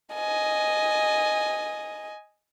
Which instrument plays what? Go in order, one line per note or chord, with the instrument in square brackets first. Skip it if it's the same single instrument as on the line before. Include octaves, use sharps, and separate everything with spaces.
[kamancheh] D#5 G#5